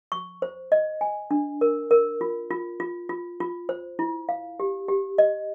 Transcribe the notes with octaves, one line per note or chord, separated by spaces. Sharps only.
C#6
C5
D#5
G#5
D4
A#4
A#4
F4
F4
F4
F4
F4
C5
E4
F5
G4
G4
D#5